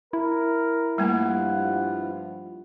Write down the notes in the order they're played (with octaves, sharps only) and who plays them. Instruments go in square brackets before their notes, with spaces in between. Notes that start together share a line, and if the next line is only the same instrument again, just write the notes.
[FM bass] E4 [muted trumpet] A#4
[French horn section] G2 F3 F4 [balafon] G3 A3 A#3 [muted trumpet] F#5